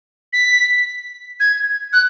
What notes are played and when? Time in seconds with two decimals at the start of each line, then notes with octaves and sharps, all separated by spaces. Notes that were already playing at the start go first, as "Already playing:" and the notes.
0.33 B6
1.40 G#6
1.93 F#6